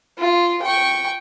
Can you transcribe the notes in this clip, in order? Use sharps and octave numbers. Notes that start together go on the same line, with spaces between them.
F4
G5 C#6